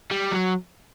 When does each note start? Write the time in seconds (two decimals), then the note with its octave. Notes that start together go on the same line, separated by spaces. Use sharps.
0.11 G3
0.32 F#3